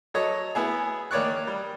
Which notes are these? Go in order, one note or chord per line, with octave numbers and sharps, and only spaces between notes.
F#3 A4 C#5 D#5
B3 E4 G#4
D#3 A#3 C#5 D5 C#6 F#6
G3